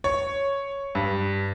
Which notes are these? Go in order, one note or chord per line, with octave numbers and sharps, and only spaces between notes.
C#5
G2